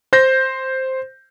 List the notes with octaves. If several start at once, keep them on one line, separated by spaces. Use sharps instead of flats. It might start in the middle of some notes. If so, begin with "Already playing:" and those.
C5 G6 A#6